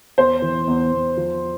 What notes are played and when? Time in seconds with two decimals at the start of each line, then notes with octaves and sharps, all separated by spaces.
0.17 E2 C5
0.42 E3
0.67 E2
0.92 E2
1.17 F3